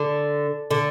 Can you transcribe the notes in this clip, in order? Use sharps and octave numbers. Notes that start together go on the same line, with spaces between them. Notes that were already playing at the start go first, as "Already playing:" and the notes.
Already playing: D3
D3